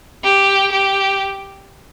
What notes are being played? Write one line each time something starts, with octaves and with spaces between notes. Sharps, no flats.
G4
G4